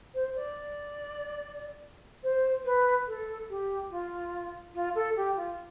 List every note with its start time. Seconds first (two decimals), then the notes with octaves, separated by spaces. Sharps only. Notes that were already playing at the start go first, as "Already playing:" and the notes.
0.14 C5
0.35 D5
2.23 C5
2.65 B4
3.07 A4
3.49 G4
3.90 F4
4.74 F4
4.95 A4
5.16 G4
5.36 F4